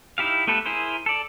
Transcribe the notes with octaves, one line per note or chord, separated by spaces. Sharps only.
D#4 E4 G4 F5
A3 B3 G4 A4 B4
E4 G#4 A#4 C5
A4 D5